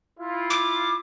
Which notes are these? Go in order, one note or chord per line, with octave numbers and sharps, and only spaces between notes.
E4 F4
D6